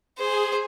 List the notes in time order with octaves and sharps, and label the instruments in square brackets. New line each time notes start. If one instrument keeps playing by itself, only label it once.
[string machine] G#4 [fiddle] C5